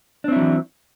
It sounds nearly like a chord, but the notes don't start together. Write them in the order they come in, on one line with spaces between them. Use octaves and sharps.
D4 C4 E4 F#3 E3